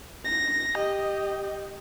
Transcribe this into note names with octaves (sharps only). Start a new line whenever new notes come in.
A#6
G4 D#5